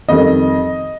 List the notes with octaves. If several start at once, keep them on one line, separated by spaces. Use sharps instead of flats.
F2 D#3 G3 C4 D#5